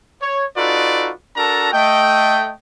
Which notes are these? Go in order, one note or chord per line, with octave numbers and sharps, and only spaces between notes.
C#5
D#4 F4 F#4 A4 B4 D5
D4 F#4 A4 A#4 A5 A#5
A3 D#5 G5